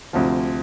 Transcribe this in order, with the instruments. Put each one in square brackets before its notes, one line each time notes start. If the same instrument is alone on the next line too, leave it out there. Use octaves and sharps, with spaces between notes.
[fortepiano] D2 C3 F3